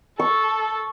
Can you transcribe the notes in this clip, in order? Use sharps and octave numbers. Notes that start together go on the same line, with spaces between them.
A4 C#6